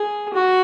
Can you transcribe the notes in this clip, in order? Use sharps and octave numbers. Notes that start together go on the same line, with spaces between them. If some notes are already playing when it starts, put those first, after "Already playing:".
Already playing: G#4
F#4